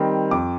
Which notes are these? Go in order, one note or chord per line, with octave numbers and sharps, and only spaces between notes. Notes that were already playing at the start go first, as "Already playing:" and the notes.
Already playing: D#3 G3 C4
F2 D6